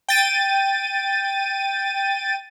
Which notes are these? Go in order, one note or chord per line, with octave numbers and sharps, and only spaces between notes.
G5 A6 D#7